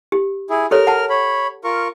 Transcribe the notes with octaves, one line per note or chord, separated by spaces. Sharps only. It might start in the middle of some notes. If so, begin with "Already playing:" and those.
G4
E4 G#4
G4 A4 A#4 C#5 F6
F#5 A5
C#5 B5
F4 A#4 C#6